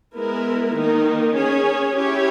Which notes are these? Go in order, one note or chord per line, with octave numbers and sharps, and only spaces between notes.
G#3 B3 E4 A#4
D#3 A#3 D#4 A#4
C#4 G#4 C#5
C#4 E4 G4 C#5